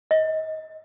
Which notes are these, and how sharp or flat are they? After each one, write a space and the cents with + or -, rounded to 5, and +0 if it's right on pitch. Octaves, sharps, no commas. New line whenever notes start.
D#5 +25